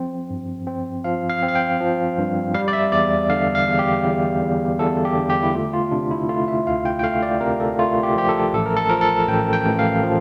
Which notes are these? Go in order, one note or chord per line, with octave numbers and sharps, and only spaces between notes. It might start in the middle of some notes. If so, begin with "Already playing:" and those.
Already playing: F3 C4
G2
C4
F3 F5
F5
C4
F5
G5
F3
G2
G3 F5
D5
E5
E2 D5
D3 F5
F5
E2
G4
E2
E2
E2 A4
G4
D3
G4
E4
A3 F4
F4
C3 D4
E4
A3 F4
E5
D2 F5
G5
G5
A3 F5
D5
C3 A#4
A4
A3 F4
G4
F3 G4
A4
A1 A4
A#4
A4
F3 A#4
A4
A1 G5
G5
A1
F5
F3